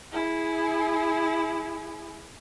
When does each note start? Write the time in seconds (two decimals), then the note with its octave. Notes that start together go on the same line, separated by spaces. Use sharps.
0.12 E4 G#4